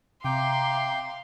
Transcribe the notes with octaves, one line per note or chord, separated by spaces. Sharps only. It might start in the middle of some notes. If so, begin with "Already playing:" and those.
C3 E5 F5 G5 A#5 C6 D6 G6